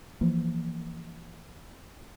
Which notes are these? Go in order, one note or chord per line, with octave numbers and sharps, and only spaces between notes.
E3 F3 A#3